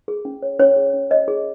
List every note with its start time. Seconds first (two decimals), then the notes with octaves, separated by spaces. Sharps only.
0.08 G#4
0.25 C#4
0.42 C#5
0.59 C#4 C#5
0.76 G#4
0.94 C#4
1.11 C#5 D#5
1.28 G#4